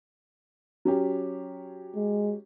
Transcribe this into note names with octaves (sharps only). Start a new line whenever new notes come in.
F#3 C#4 G4
G#3